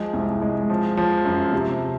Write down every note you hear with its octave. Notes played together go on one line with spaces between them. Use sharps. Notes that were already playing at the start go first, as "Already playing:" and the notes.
Already playing: F3 G#3
C2
G#3
F3
F3
F#2
C3